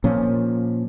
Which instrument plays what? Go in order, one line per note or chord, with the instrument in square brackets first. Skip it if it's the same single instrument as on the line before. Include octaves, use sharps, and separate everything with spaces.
[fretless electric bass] A#2 F3 C#4